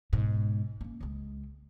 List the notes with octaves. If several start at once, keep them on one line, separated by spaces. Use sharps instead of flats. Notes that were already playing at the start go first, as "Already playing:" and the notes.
G#2 B2
A#3 C#4
C#2 G#3